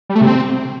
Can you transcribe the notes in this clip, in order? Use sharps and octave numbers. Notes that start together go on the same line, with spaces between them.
G3
A3
C3
C4